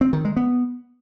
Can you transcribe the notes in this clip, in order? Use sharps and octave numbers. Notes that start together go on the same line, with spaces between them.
C4
D#3
G#3
B3